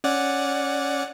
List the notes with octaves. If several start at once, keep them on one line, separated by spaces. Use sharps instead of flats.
C#4 D5 F#5